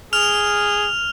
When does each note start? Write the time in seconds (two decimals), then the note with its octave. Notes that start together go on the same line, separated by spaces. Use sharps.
0.13 G#4 F6 F7